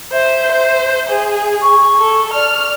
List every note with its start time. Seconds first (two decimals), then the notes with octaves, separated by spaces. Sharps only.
0.13 C5 E5
0.52 C5
1.09 G#4
1.62 C#6
1.99 A4
2.34 D5 F6